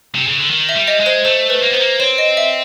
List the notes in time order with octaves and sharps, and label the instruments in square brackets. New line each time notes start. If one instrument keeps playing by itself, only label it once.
[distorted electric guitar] C3
C#3
D3
D#3
[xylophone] E5
[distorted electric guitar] G3
[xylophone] D#5
[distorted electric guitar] G#3
[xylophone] C5
[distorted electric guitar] A3 [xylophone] C5
[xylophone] B4
[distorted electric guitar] A#3
B3
[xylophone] C5
[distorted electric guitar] A#3
[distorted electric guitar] C4 [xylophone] C#5
[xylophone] D#5
E5